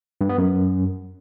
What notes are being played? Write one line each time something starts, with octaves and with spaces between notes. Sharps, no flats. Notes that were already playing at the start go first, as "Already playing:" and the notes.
G2
B3
F#2